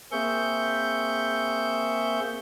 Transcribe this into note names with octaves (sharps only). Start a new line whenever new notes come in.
A#3 C4 G#4 E5 C#6 G6